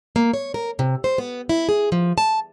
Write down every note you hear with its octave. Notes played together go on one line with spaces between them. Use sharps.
A#3
C#5
A#4
C3
C5
B3
E4
G#4
F3
A5